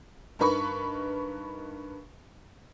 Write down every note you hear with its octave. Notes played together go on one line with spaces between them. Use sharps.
G2 D#4 A#4 B4 B5 C#6